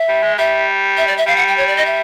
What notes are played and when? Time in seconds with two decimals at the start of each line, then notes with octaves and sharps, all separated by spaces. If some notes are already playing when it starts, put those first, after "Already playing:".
Already playing: E5
0.09 G3
0.23 G#3
0.38 G3 E5
0.97 E5
1.07 D5
1.17 E5
1.27 G3 F5
1.37 F#5
1.47 G5
1.57 C#5
1.67 D5
1.77 D#5
1.85 E5